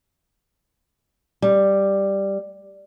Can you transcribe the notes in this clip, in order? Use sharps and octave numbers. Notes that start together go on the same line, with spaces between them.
G3